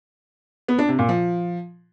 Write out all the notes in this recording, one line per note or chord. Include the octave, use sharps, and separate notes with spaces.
B3
D4
C3
A#2
F3